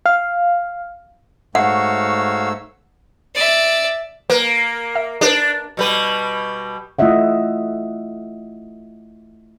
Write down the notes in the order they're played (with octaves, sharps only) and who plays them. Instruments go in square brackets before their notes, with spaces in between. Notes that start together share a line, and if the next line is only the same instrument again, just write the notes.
[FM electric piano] F5
[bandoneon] G#2 A3 E6 [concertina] F#4 C#5 F5 [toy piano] F#5
[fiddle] D5 E5
[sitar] A#3 [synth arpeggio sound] B4
[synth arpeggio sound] E5
[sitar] D4 [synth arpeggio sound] G4 A#4 B4
[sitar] B2 G3 B4
[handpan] A3 E4 F4 D#5 E5 F#5